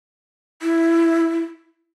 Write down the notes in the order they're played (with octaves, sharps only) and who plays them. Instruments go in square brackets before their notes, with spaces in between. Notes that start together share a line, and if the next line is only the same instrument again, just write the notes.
[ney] E4